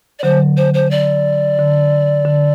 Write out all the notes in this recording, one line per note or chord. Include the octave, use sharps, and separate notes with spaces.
D5
D3 F#3 C5
C5
C5
D5
D3
D3